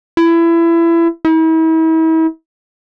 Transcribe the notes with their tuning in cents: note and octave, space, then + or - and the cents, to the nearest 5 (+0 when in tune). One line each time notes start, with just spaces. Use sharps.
E4 +25
E4 -40